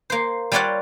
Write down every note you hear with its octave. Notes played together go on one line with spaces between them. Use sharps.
A#3 C5
G3 F4 G4 C#5 D5 F#5